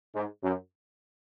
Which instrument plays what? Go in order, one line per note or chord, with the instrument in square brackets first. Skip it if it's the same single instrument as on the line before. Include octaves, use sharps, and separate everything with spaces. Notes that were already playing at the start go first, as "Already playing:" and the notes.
[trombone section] G#2
F#2